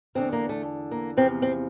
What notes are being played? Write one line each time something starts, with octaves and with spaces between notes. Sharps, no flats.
E2 D3 A3 C4
A#3
A3
A#3
E2 C3 F3 C4
C4